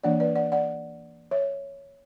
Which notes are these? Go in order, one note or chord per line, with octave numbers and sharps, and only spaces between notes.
E3 A#3 D4 D5 F#5
B4 D5
D5 F#5
D5 F#5
C#5 E5